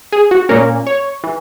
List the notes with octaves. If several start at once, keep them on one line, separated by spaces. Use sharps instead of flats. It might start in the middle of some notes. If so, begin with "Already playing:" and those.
G#4
F#4
A#2 A#3 C#4 A#4
C#5
E3